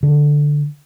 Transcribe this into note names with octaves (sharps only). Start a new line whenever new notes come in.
D3